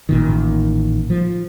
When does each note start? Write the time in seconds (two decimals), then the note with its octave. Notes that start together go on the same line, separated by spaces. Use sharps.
0.09 A1 A#2 D#3
1.10 F3